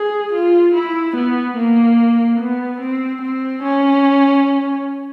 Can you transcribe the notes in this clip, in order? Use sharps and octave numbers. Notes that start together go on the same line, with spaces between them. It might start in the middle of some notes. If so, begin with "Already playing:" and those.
Already playing: G#4
F4
E4
B3
A#3
B3
C4
C4
C#4